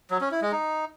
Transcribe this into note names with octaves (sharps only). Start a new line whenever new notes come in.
F#3
C#4
E4
G#3
D#4